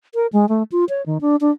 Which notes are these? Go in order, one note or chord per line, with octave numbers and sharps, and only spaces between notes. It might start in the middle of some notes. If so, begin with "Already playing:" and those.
A#4
G#3
A3
F4
C#5
D#3
D4
D4